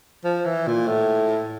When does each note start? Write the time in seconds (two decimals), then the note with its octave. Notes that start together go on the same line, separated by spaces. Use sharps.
0.24 F3
0.45 E3
0.67 A#2
0.87 A2